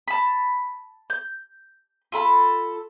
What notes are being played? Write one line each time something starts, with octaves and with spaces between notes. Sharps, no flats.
A5 B5
G6
F4 A4 B5